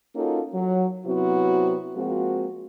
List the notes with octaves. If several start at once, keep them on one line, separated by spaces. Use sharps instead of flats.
A#3 C#4 D#4 F4 F#4 A4
F#3
C3 F#3 B3 C4 E4 F#4
F3 G#3 A#3 C4 F#4